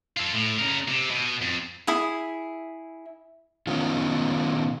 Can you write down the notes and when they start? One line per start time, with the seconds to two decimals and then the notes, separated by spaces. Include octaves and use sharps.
0.17 F4 A4
0.33 A2
0.59 C#3 A#4
0.89 C3
1.11 B2
1.42 F2
1.87 E4 G#4
3.67 B2 D#3 C#4 F4